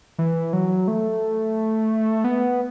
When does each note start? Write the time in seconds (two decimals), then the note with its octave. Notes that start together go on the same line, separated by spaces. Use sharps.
0.19 E3
0.53 F#3
0.88 A3
2.24 B3